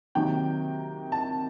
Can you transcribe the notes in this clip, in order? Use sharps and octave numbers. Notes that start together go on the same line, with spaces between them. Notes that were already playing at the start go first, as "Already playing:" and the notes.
C3 D#3 F#3 A#3 D#4 G5
A5